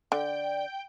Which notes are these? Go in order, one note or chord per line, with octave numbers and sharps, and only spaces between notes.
D3 D5 G5